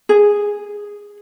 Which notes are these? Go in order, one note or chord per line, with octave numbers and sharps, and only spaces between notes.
G#4